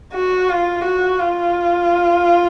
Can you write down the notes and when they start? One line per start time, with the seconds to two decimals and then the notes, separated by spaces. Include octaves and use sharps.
0.13 F#4
0.49 F4
0.84 F#4
1.20 F4